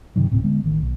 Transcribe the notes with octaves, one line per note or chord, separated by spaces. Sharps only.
G2 C3 D#3 F#3
D1 A2 C3 C4
D3 G#3 B3
A1 D#3
B1